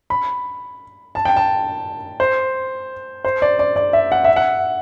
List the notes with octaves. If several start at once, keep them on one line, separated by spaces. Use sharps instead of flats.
B5
A5
G5
A5
C5
C5
D5
D5
D5
E5
F#5
E5
F#5